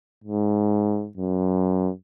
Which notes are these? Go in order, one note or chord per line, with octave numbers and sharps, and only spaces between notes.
G#2
F#2